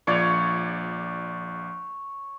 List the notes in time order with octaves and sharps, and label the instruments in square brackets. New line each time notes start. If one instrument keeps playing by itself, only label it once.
[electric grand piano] A#1 F4 D5 [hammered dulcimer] C#5